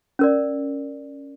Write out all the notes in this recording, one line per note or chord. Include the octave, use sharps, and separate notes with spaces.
C#4 A#4 D5